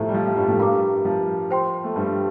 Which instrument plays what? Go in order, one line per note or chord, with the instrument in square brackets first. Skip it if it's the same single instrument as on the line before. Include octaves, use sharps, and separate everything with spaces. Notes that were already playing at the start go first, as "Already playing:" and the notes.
Already playing: [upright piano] A2 F3 A3 [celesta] G4 C5 E5 A#5
[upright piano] G3
F3
F3
G2 G3
A2 A3
[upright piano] G2 G3 [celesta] A#4 F5 A#5 D6
[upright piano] F3
[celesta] C5 G5 C6
[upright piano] A3
G2 G3